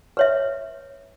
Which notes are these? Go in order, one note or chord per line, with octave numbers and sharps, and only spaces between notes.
B4 C#5 E5